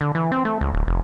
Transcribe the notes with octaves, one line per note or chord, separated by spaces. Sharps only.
D3
E3
C4
A3
C#2
D1
F1